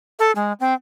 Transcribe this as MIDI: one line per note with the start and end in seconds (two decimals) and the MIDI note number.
0.19 0.32 69
0.35 0.53 56
0.60 0.73 60